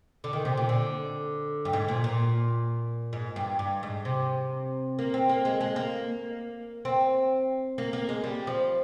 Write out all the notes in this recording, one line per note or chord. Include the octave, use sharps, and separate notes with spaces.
D3
D#3
C3
A#2
D3
G2
G#2
A#2
A#2
G#2
G2
G2
G#2
C3
A#3
C4
A#3
G#3
G#3
A#3
C4
A#3
A#3
G#3
G3
F3